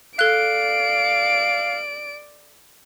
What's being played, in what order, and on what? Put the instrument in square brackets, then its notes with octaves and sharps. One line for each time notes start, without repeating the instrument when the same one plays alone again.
[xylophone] A4 F#6 [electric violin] D5 D7 [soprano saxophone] F5